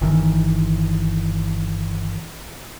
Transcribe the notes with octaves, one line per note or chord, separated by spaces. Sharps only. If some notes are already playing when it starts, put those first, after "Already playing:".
G1 D#3 E3